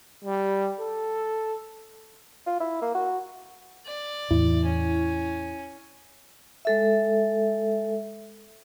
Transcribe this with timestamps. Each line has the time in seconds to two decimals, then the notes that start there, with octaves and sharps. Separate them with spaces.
0.24 G3
0.80 A4
2.47 F4
2.60 E4
2.82 A#3
2.95 F#4
3.86 D5
4.31 E2 A2 E3 E4
4.65 C#4
6.65 G#3 A4 E5